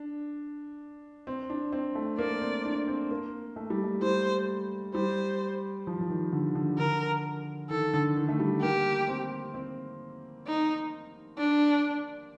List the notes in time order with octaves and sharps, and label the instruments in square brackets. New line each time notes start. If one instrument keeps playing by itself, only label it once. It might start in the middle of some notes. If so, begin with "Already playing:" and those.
Already playing: [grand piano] D4
C4
D4
C4
A3
[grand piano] A#3 [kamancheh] D5
[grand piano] C4
D4
C4
A#3
A3
G3
A3
[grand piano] G3 [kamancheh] C5
[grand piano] G3 [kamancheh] C5
[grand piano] F3
F3
D#3
D3
D3
[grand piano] D3 [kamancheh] A#4
[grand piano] D#3 [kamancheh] A4
[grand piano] D3
D#3
A3
G3
[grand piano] A#3 [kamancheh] G4
[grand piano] C4
C4
[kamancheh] D#4
D4